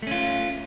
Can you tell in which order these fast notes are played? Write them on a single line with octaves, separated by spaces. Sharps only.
A3 C#4 F4